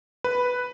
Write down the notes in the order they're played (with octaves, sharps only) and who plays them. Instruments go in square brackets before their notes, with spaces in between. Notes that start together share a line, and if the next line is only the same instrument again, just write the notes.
[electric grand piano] B4